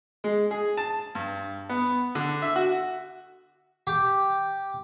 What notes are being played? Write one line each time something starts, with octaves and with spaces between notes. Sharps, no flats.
G#3
G#4
A5
G2
B3
D3
E5
F#4
G4